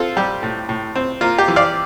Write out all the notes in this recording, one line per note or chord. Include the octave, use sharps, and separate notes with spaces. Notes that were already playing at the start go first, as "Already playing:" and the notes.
Already playing: C4 F4 A4
G3 G4
A2
A2
C4
A#3 F4
G4
E3
D5 F5